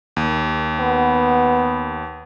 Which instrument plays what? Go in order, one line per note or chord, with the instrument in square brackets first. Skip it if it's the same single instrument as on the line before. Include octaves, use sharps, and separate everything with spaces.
[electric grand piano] D#2
[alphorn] B3